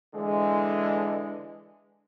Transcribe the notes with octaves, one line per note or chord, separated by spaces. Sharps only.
D3 E3 G#3